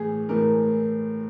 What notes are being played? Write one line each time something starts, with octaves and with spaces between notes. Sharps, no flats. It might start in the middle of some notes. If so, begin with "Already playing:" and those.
Already playing: A2 E3 A3 G#4
A2 E3 A3 A#4